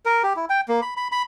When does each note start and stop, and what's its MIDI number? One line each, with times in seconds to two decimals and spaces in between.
0.06 0.23 70
0.23 0.33 67
0.36 0.45 64
0.50 0.61 79
0.68 0.81 58
0.82 0.94 83
0.97 1.08 83
1.12 1.22 83